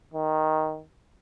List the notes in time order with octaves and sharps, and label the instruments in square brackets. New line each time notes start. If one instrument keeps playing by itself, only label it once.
[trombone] D#3